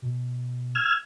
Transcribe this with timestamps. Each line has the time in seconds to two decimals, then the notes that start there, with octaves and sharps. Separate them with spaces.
0.02 B2
0.75 E6 F6 G#6